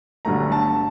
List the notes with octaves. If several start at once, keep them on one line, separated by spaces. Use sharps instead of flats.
G1 G2 D3 F#3 A3 A#5
A5